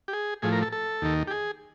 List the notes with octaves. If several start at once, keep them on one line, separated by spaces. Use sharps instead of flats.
G4
G#4
A2 F3 G#4
A#4
A4
A4
D#2 D#3
G4
G#4